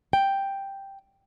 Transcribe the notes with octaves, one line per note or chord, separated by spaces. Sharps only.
G5